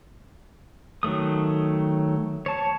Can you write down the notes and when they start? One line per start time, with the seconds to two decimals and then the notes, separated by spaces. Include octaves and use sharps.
1.03 D#3 F#3 A3 D#6
2.46 C#5 A5